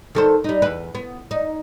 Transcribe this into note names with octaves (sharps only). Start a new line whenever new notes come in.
D#3 A4 C5
G3 D#4
E2 B4
B3
D#4